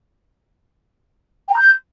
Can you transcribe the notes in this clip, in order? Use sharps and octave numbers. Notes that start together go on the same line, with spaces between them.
G5
A#5
G6